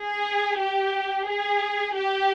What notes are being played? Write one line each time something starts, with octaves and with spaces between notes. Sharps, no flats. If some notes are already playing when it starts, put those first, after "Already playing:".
Already playing: G#4
G4
G#4
G4